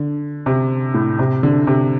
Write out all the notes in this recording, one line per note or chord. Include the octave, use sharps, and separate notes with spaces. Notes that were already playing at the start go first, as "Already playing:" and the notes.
Already playing: D3
C3
A2
C3
D3
C3